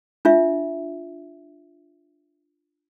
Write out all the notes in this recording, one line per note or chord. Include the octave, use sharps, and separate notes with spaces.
D4 F4 E5